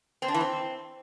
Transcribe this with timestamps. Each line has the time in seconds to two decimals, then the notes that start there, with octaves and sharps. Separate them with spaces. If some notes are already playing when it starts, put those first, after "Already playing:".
0.22 C4
0.28 D4
0.34 E3
0.41 C4